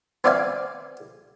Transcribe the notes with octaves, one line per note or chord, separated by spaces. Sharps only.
B3 C4 D5 E5 F5 G#5